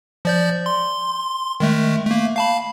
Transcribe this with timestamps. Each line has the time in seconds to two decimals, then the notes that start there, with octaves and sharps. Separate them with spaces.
0.25 F3 D5 G6
0.66 C6
1.60 D#3 G#3 A3
2.06 A3 A#3
2.36 F5 A5 B5